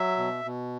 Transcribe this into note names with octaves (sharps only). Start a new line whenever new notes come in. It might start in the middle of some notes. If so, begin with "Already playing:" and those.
Already playing: F#3 E5
B2
B2